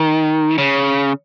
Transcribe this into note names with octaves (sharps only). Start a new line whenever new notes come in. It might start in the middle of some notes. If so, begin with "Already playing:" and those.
Already playing: D#3
C#3